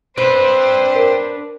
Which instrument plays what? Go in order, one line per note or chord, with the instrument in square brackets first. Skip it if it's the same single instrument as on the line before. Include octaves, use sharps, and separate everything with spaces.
[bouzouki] C4 [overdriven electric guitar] D4 B4 [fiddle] C5
[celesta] A#4